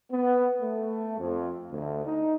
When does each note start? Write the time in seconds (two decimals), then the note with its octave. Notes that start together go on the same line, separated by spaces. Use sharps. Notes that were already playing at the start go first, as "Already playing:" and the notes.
0.11 B3
0.61 A3
1.19 F2
1.70 D2
2.05 D#4